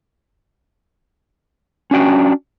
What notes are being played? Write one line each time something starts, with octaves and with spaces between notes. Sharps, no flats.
C#4 D4 F#4 G5